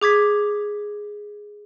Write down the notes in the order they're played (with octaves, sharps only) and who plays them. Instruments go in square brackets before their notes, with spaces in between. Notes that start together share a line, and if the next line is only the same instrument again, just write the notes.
[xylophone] G#4 D6 G#6 B6